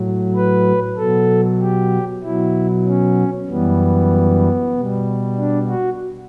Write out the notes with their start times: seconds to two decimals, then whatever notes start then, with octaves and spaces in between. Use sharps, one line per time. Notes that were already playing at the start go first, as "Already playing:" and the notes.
Already playing: A2 F#3
0.35 B4
0.97 B2 F#3 A4
1.61 G4
2.23 B2 F#3 E4
2.86 C#4
3.49 F#2 E3 G3 B3
4.74 B2 G3
5.37 D4
5.67 F#4